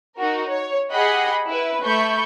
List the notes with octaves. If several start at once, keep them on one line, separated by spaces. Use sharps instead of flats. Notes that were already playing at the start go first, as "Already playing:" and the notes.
D#4 F#4 A#4
C#5
G4 G#4 D#5 F#5 B5
E4 B4
A3 B5 C#6 G6